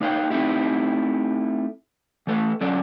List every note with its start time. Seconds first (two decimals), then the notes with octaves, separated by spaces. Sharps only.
0.01 A#3 D#4 B4 C#5 F5 G5
0.30 A3 C4 D#4 E4 G4
2.27 E3 A3 A4 B4
2.61 D3 F#3 C#4 A4 D5